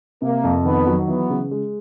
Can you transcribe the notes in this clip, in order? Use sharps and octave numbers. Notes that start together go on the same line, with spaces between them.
C3 A#3
F2
D#3 B3
F#3
E3 B3
C#3
G#3